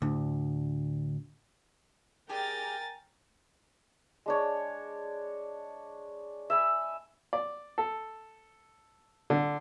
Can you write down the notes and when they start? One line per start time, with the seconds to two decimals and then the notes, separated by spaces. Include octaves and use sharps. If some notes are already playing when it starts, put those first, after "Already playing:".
0.02 D2 A2 D4
2.29 G4 G#4 A#4 D5 G5 G#5 A#5 A6
4.26 G#3 D4 C#5
6.50 E5 G#5 B5
7.33 D5
7.78 A4
9.30 D3